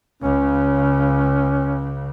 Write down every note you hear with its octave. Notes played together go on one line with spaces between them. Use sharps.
C#2 C#3 C#4